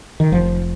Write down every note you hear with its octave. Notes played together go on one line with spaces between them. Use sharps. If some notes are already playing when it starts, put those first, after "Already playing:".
D#3
F1 F3